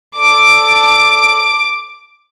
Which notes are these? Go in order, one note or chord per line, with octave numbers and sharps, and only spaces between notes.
A4 D5 A5 D6 D7